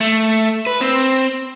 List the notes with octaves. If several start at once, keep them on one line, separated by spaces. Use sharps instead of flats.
A3
B4
C4